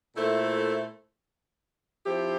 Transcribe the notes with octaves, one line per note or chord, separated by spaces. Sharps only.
A#2 A3 E4 A4 C5
F3 C4 E4 G4